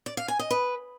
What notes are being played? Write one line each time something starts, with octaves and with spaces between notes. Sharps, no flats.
D5
F5
G#5
D#5
B4